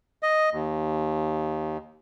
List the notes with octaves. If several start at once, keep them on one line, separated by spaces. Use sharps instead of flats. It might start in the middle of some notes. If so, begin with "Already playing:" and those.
D#5
D#2